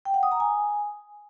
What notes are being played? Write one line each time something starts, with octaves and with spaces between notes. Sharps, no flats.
G5
F#5
D#6
A#5
G#5